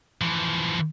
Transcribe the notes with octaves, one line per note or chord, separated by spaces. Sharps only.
E3 F3